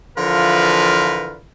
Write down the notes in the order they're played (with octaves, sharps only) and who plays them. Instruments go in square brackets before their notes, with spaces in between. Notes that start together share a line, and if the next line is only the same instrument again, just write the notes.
[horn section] D3 E3 F3 F4 A#4 B4